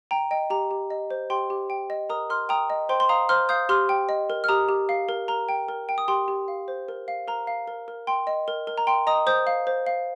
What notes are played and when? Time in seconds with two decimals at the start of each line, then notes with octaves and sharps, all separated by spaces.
0.11 G5 A#5
0.31 D#5 G5
0.50 G4 A#5
0.71 G4
0.90 D#5
1.11 C5
1.30 G4 G5 C6
1.50 G4
1.70 G5
1.90 D#5
2.10 A#4 A#5 D#6
2.30 A#4 C6 F6
2.49 G5 A#5 D#6
2.70 D#5
2.89 C5 G5 C6
3.00 C6
3.09 F5 A#5 D#6
3.29 C5 C6 F6
3.49 F5 D#6 G6
3.69 G4 C6 F6
3.89 G5
4.09 D#5
4.30 A#4
4.44 F6
4.49 G4 A#5 D#6
4.69 G4
4.89 F5
5.09 A#4
5.28 A#4 A#5
5.49 G5
5.69 A#4
5.89 G5
5.98 D#6
6.08 G4 G5 C6
6.28 G4
6.48 F5
6.68 C5
6.89 A#4
7.08 F5
7.28 A#4 A#5
7.47 F5
7.68 A#4
7.88 A#4
8.07 G5 C6
8.27 D#5
8.48 A#4
8.67 A#4
8.78 A#5
8.87 G5 C6
9.07 D#5 A#5 D#6
9.27 C5 D#6 G6
9.47 F5
9.67 C5
9.87 F5